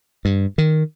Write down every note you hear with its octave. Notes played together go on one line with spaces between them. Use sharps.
G2
D#3